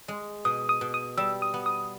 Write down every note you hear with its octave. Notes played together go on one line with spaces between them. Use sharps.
G#3
B2 D#6
D#6
B2
D#6
G3 E6
D#6
B3
D#6